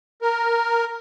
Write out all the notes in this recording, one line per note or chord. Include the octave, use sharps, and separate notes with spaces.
A#4